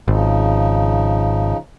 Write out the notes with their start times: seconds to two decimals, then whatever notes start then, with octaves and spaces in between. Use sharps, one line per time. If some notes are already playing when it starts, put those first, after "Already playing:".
0.08 G#1 C#3 F3 D#4